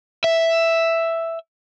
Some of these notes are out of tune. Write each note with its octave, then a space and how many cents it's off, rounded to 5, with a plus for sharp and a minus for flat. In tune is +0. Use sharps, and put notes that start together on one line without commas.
E5 +5